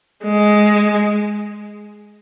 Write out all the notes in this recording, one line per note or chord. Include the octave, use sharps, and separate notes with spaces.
G#3